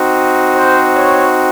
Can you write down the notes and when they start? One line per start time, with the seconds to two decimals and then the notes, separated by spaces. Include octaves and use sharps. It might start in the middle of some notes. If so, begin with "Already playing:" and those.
Already playing: C4 D#4 F#4
0.56 C5
0.96 C#5